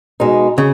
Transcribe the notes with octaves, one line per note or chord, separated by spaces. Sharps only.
B2 G#3 D#4
C#3